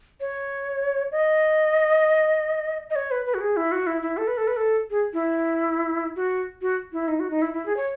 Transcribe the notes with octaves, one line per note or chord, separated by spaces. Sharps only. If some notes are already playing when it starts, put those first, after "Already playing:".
C#5
D#5
D#5
C#5
B4
B4
F#4
G#4
E4
F#4
E4
E4
A4
B4
A4
B4
A4
G#4
E4
F#4
F#4
E4
D#4
F#4
D#4
E4
E4
G#4
C#5